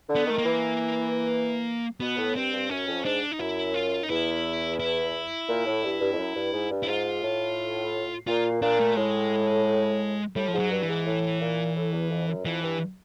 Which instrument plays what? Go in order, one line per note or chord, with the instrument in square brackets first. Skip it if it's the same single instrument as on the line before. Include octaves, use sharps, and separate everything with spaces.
[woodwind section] D3
[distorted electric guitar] B3
[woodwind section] D#3 [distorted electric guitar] A3
[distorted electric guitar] A#3
[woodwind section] E3
[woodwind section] B2 [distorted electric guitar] B3
[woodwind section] A2
[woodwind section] G2 [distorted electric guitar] C4
[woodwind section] G2
[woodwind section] F#2 [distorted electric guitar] C#4
[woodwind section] F2
[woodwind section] G#2 [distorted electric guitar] D4
[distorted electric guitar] D#4
[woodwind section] F#2 [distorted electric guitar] E4
[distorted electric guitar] F4
D#4
[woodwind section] E2 [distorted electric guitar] E4
[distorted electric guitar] E4
[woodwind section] A#2
A2
G2
G2
F2
F#2
G2
G#2
G2
[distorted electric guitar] E4
[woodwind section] G#2 [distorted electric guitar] F4
[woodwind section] A2
[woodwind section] A#2 [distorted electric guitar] F4
[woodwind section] A#2 [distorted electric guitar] D4
[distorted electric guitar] A3
[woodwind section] A2 [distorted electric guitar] G#3
[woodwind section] A2 [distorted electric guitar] G3
[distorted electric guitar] F3
[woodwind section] G#2
[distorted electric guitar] F#3
[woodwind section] G2
[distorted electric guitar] E3
[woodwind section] G#2
A2
A#2
A2
E2
F2
F#2
[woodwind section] F2 [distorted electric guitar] E3
[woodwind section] G2